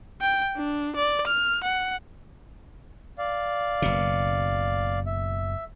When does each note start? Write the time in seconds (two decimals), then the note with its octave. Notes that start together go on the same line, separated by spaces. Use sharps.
0.21 G5
0.56 D4
0.96 D5
1.27 F6
1.64 F#5
3.18 D5 F5
3.82 F#1 B2
5.06 E5